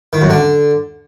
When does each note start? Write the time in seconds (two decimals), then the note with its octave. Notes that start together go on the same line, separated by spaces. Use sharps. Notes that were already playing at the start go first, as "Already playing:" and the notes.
0.13 D#3
0.21 F#2
0.30 D3